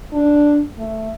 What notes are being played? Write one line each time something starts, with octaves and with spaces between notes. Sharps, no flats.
D4
A3